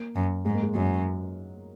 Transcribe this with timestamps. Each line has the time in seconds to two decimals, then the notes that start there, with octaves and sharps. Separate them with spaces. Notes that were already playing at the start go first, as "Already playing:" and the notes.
Already playing: A#3
0.16 F#2
0.45 G#2 G#3
0.54 A#3
0.63 G#3
0.75 F#2 F#3